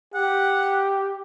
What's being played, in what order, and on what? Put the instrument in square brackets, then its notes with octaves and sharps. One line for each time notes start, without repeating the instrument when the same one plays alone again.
[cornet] G4 [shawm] F#5